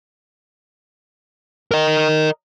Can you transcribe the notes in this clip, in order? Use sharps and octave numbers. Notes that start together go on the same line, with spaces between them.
A#4 D#5